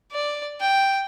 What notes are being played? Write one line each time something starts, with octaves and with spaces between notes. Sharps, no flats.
D5
G5